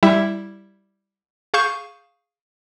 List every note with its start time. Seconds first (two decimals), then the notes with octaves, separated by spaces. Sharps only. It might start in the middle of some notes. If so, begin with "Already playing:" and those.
0.03 G3 E4 E5
1.54 G#4 F5 C#6 G6 E7